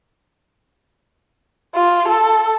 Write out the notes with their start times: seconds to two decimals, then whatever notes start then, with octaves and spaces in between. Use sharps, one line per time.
1.75 F4
2.09 A4